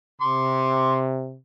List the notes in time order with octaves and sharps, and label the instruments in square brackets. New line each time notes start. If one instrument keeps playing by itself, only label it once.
[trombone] C3 [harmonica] C6 D6